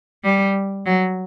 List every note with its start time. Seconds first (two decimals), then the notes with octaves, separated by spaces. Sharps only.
0.24 G3
0.86 F#3